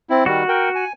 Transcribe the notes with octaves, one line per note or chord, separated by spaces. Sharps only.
C4 E4
D#3 G3 F#4
A#4 G5
G#5